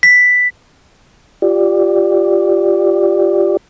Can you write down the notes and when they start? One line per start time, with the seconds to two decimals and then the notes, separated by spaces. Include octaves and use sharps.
0.03 B6
1.42 F4 G4 D5